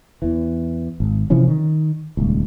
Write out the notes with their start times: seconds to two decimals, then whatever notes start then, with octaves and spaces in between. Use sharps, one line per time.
0.22 E2 E3
1.00 G#1
1.30 C3 E3 F3 C#4
1.48 D#3
2.17 D#1 C#2